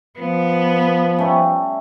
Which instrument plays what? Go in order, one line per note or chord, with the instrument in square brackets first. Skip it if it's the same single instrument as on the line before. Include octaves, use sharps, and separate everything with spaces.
[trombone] F3 [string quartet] B3
[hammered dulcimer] G3 A3 C#4